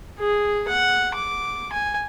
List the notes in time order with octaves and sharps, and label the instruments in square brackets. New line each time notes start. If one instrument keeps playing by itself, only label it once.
[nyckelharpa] G#4
F#5
D6
G#5